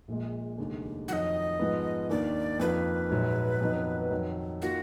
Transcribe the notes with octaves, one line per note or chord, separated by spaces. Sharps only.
A#1 A#2 G#3
F1 D#2 D3 G#3 D#4
F2 D#3 F#3 D#5 F#5
G#2 F3 G#3 B3
D#2 D#3 A#3 D4 D5
F2 D#3 A#3 F4 B4
A#1 G#2 F#3
F2 D#3 F#3 B3 D#4
F2 D#3 F#3
D#3 A#3 F4 F#4